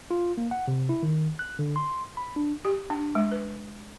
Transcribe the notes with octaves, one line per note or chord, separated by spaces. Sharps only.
F4
A#3
F#5
C3
E4
D#3
F#6
D3
C6
B5
D4
G4
D4
G#3
B4